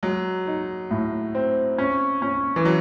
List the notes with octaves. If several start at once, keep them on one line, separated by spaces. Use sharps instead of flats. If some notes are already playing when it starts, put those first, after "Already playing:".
F#3 G#3
D#4
A2
C4
C#4
C#4
E3
F#3